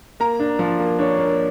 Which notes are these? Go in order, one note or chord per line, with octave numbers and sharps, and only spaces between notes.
A#3 A#5
D4
F3
A#3
D4 C#5
A#3